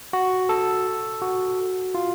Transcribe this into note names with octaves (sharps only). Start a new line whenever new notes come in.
F#4
A4
F#4
F4